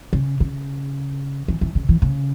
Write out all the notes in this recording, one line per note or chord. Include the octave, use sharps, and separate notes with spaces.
C#3
C#3
E3
E3
C#3
E3
C#3